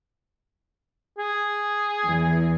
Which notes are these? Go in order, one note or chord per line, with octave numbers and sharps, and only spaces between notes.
G#4
E2